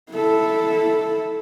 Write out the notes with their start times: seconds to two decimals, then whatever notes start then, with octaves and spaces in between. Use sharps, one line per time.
0.12 E4 A4